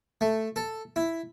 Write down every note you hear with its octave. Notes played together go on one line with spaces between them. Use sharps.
A3
A4
E4